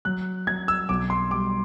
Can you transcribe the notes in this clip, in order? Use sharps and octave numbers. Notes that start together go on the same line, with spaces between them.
F#3 F#6
F#3 G#6
E6
B1 D6
C6
G3 D6